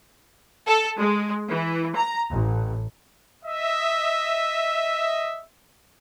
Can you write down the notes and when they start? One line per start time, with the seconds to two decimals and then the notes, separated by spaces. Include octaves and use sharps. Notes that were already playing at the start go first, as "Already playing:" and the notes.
0.67 A4
0.98 G#3
1.49 E3
1.95 A#5
2.31 A1
3.44 D#5 E5